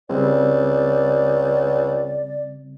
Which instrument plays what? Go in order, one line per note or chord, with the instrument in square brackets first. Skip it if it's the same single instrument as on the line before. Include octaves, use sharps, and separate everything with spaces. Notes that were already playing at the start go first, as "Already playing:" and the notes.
[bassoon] C#2 [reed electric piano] C#3 G3 C4 [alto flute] D5